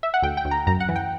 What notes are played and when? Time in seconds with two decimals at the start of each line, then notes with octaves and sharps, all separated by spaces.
0.03 E5
0.14 F#5
0.22 D2 G5
0.37 G5
0.45 D2
0.51 A#5
0.67 F#2 A#5
0.80 F#5
0.89 E3
0.96 G5